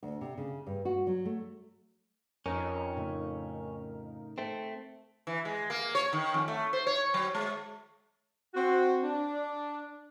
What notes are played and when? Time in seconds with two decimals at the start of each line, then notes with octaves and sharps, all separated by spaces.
0.03 D2
0.21 C3
0.37 C#3
0.66 G2
0.85 F#4
1.07 F#3
1.25 A3
2.46 F2 C#4 D#4 A#4
2.97 A2 C#3 A3
4.38 A3 C4
5.27 E3
5.45 G#3
5.70 A#3
5.95 C#5
6.13 D#3
6.34 F2
6.48 A3
6.73 C5
6.87 C#5
7.14 F#3
7.34 G#3
8.55 C4 F#4
9.03 D4